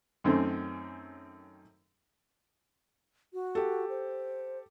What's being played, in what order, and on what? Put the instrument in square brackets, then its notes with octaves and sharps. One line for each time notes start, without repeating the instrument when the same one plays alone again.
[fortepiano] F#2 D#3 A3 C4 C#4
[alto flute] F#4
[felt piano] G4 A4
[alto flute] C5